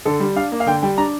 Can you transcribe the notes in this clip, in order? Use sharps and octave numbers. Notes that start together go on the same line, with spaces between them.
D3 A4
G3
D4 F5
A#3
F5
D3 G5
G3 G5
D4 A#5